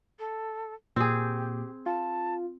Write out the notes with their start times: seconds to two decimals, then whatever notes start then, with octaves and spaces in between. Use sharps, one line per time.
0.19 A4
0.96 A#2 C4 G4 G#4
1.86 F4 A5